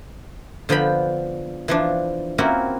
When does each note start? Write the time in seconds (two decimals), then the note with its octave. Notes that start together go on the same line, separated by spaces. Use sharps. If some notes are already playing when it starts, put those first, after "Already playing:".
0.69 D3 F3 B3 G5 B5
1.68 E3 F3 D4
2.38 A#3 C4 C#4 E4 F#4